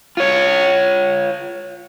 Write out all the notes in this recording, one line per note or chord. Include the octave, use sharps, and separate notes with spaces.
F4 C#5